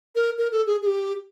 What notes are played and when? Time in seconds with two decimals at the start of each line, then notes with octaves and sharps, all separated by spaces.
0.15 A#4
0.38 A#4
0.52 A4
0.66 G#4
0.82 G#4
0.87 G4